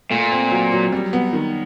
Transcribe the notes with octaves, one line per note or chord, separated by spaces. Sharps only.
A#2 A3
C4
F#3
F#3
G3
B3
D#3